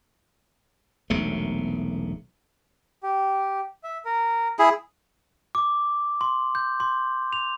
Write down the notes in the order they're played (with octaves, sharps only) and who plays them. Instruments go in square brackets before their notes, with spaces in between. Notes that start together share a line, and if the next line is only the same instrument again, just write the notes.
[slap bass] E1 B1 C3 A3
[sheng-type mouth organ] G4
E5
A#4
[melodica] E4 G#4
[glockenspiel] D6
C6
G6
C6
F7